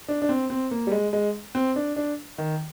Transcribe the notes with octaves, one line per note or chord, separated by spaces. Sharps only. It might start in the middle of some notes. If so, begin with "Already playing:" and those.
D4
D4
C4
C4
A#3
G3
G#3
G#3
C4
D4
D4
D#3